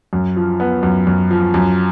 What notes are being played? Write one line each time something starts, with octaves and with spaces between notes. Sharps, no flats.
F#2
F3
B3
F#2
F#2
F3
F#2